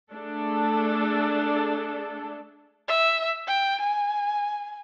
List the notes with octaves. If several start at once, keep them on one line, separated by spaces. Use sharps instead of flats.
A3 D4 G#4 A4
E5
G5
G#5